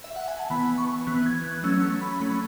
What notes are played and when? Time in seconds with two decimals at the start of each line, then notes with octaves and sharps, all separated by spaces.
0.04 E5
0.16 F#5
0.28 G#5
0.39 A5
0.50 E3 B3 B5
0.78 C#6
1.07 E3 B3 F#6
1.26 G#6
1.44 F#6
1.63 F#3 A3 C#4 E6
1.82 C#6
2.02 B5
2.19 F#3 A3 C#4 B5
2.29 C#6